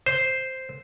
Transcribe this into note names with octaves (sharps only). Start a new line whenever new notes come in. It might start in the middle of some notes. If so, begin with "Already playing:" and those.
C5